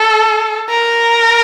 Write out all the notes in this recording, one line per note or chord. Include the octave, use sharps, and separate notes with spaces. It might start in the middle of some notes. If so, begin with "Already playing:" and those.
Already playing: A4
A#4